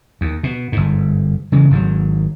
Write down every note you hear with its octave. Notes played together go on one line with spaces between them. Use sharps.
D#2
B2
G1 G#2
C#3 E3 G#3
G#1 G#2 D#3 F#3